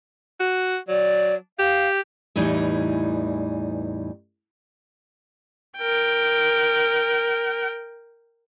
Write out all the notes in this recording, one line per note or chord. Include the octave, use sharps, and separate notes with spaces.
F#4
F#3 D5
G4 F5
E2 A2 E3 G3 D#4
A#4 G5